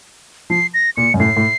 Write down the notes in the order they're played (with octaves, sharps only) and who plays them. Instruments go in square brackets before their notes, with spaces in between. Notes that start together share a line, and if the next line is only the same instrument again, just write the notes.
[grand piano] F3 [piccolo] C7
[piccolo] A#6
[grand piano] A#2 [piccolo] C#7
[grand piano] F#2
[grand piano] A2 [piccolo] C7
[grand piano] A2